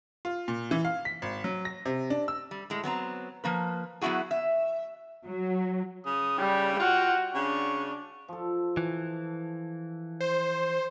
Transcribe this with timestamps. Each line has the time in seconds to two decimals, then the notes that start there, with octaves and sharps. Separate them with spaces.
0.25 F4
0.48 A#2
0.71 E3
0.85 F5
1.05 B6
1.22 G#1
1.44 F#3
1.65 A#6
1.86 C3
2.10 D4
2.28 E6
2.51 G3
2.70 A2 G#3
2.84 F#3 B3 C4 A#5
3.44 F3 A#3 B4
4.01 F#3 B3 C4 E4 F#4 G#4
4.31 E5
5.26 F#3
6.06 C#3 D#6
6.39 G3 G5
6.80 F4 F#4
7.35 C#3 D4 C#6
8.28 F3 A4
8.77 E3
10.20 C5